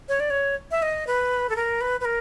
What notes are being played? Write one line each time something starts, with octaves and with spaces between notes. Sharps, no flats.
C#5
D5
C#5
E5
D#5
B4
A4
A#4
B4
B4
A#4